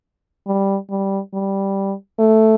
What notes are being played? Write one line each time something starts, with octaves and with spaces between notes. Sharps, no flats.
G3
G3
G3
A3